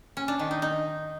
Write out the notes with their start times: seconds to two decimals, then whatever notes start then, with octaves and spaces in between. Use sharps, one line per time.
0.17 C#4
0.28 D4
0.39 D#3
0.51 D#4
0.62 D#4